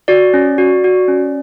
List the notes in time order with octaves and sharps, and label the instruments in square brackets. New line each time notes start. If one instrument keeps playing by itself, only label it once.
[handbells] F#4 D5
C#4
F#4
F#4
C#4